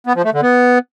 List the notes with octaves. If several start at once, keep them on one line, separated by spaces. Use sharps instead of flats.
B3
F3
A3
D3
B3